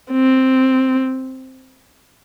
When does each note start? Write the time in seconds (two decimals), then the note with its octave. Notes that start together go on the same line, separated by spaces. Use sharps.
0.11 C4